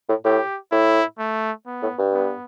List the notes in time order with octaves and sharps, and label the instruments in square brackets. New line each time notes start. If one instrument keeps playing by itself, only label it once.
[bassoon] A2
[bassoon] A2 [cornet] G4
[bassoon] A2 [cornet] E4
[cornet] A3
B3
[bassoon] A2
G2
[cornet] B3